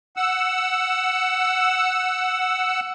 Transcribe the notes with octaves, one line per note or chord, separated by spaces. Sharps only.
F#5 E6